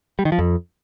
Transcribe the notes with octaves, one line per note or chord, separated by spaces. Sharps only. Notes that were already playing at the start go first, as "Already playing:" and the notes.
G3
D#3
F3
F2